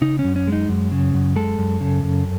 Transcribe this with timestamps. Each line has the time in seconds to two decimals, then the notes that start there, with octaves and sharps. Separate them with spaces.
0.01 C#3 D#4
0.19 C#4
0.24 F#2
0.36 C#4
0.47 G#3
0.52 D#4
0.69 F#2
0.91 C#3
1.14 F#2
1.36 G#3 A4
1.58 F#2
1.81 C#3
2.03 F#2